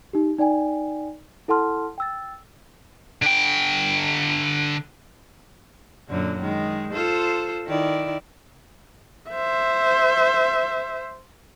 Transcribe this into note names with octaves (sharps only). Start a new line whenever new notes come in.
D#4 G4
D#4 D5 G5 G#5
E4 A4 F#5 A5 C6 F6
G5 E6 A6
D3 G5
F#2 A#2 D3
D#3 G#3
F4 A4 C5
D#3 E4 D5
C5 E5